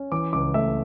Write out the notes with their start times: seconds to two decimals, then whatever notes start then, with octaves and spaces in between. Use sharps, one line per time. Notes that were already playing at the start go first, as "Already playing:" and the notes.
Already playing: C#4
0.12 E3 D6
0.33 C#2 D6
0.54 A3 E5